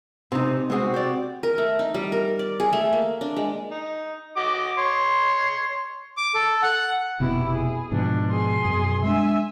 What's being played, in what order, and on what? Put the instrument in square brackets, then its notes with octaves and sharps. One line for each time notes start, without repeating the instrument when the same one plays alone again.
[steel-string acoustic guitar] C3 [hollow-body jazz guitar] C4 D#4
[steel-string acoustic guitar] C3 C4 F#4 [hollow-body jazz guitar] G#3 G#4
[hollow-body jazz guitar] C5 D5
[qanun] A#4
A3
D#4
G3
A#4
D5
G#4
A3
A#3
D4
G#3
[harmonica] D#4
F#4 D#5 D6
C#5 C6
[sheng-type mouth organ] D6
A4
F#5
[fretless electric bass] F1 B2 B3 [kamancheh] E4 G4
[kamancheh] G#4
[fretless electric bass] G#2 B2 F3 [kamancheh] D4
[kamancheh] G#4 C6
[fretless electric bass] F#2 B2
[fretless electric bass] G#3 A3 D4 [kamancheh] E5 G#5